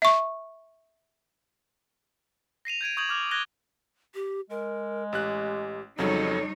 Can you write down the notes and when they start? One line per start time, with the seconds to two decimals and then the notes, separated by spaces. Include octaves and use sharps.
0.02 E5 C#6
2.65 A#6 C7 D#7 F7
2.81 G6 G#6 D7 D#7
2.97 C#6 D#6 G6 G#6 F7 F#7
3.09 D6 F6 F7
3.31 F#6 G#6 A#6 G7
4.15 G4
4.50 G#3 A#4
5.13 A1 G4 F#6
5.98 F2 C#3 F#3 G3 D#4 A4 C#5